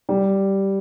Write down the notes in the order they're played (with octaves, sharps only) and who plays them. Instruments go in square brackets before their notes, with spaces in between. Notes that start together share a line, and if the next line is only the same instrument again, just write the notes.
[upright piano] G3